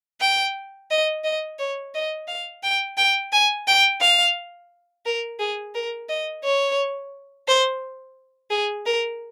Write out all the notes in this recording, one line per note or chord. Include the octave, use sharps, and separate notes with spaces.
G5
D#5
D#5
C#5
D#5
F5
G5
G5
G#5
G5
F5
A#4
G#4
A#4
D#5
C#5
C5
G#4
A#4